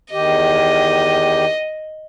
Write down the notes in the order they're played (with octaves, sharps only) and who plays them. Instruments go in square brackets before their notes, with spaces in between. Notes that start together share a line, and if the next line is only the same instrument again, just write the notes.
[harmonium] E2 D#3 G4 [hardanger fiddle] D#5